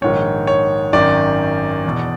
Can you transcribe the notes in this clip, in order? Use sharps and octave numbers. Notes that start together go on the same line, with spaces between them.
A#1 G#2 D#3 C#5
C#5
G#1 F#2 D#3 D5
E2 B2